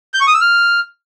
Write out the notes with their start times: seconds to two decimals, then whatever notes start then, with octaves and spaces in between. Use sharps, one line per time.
0.14 G6
0.21 C#6
0.27 D#6
0.34 E6
0.41 F6